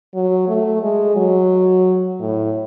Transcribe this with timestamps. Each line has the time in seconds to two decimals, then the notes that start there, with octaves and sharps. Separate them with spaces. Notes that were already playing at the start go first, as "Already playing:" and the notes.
0.14 F#3
0.48 A3
0.82 G#3
1.16 F#3
2.20 A2